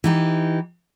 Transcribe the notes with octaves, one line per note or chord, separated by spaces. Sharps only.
E3 D#4 G4